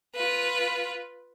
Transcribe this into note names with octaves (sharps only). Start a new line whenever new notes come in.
F4 B4